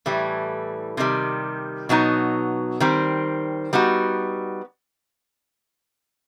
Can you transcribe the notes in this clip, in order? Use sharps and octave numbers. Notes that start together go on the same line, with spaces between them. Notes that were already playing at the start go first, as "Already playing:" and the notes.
A2 E3 G3
C3 D#3 G3
B2 F#3 B3 D#4
D#3 G3 C4
G3 B3 D#4 F#4